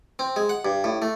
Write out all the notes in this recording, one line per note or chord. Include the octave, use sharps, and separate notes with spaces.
C4
G#3
F#5
G2
A2
A3